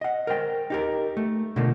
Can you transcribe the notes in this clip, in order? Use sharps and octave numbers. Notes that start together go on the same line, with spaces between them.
D#5 F#5
A#4 C5 G5
D#4 G4 A#4
A3
B2 D3 F3 A3 A#3